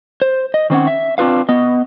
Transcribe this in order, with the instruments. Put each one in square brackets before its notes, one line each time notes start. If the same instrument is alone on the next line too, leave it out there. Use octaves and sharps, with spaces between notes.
[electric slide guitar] C5
D#5
D#3 C4 C#4 F#5
E5
C4 D4 F4 B4 F5
B3 D#5